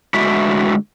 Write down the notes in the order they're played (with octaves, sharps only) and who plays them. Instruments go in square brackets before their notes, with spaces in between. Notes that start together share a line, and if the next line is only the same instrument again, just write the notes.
[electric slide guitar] D3 G#3 A3 E4 F#4 E5